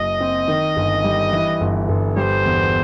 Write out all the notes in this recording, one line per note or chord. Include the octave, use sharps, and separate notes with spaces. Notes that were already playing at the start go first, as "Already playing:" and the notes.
Already playing: F#1 F#3 D#5
C4
D#3
G1
G3
E3
G1
G1
G3 C5
E2